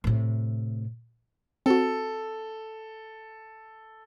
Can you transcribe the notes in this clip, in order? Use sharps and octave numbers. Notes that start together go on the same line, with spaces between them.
A2 C3
C4 F#4 A4